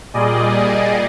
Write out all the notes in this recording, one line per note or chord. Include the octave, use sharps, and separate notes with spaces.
A#2 G3 G#4 D5 D#5